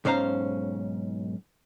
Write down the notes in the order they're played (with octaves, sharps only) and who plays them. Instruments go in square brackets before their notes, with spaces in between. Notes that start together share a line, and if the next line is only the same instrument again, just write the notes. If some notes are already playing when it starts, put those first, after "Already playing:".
[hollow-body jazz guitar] B1 G#2 C#4 C5 F5 A#5